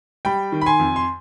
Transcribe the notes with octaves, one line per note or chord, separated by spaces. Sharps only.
G3 G5 B5
D#3
B5
G#5 C6
F2
C6